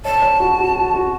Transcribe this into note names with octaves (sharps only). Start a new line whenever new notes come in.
C#5 A5
C#5
F#4
F#4
F#4
F#4